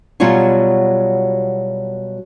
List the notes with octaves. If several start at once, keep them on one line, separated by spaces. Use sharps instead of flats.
B2 F#3 G3 F4 C#5 G#5